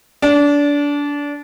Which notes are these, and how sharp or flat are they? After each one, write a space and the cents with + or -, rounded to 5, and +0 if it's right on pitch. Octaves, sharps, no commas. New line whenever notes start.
D4 -25